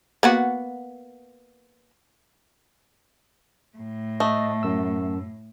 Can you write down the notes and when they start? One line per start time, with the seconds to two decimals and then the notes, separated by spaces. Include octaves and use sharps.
0.23 A#3 B3 F#4
3.77 A2
4.20 A3 D#5
4.63 F#2 E6